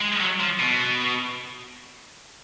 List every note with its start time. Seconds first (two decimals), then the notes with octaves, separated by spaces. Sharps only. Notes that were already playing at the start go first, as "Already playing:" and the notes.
0.01 G#3
0.20 F#3
0.40 F3
0.59 B2